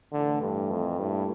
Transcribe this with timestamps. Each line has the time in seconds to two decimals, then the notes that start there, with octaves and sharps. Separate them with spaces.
0.13 A2 D3 E3 A3
0.41 G2
0.71 F2
0.99 G2 A#2 A3 E4 G4